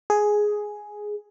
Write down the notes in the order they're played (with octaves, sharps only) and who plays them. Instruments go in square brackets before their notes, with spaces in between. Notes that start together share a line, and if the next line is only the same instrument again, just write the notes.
[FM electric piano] G#4